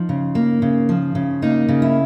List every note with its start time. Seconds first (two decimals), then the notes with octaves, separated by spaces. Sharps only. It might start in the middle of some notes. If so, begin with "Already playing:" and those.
Already playing: F3 D#4
0.09 C#3
0.35 A#3
0.62 C#3
0.89 F3
1.15 C#3
1.42 A#3 D#4
1.69 C#3
1.82 E4